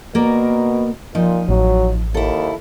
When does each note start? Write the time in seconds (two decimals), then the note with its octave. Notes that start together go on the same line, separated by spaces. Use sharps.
0.15 B2 A#3 A#4 D5
1.15 A#2 F3 D#4
1.49 A1 F#3
2.14 D#2 E4 A4